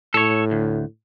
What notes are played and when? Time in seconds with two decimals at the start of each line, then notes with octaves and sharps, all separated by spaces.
0.14 A2 A4 C#5
0.51 D2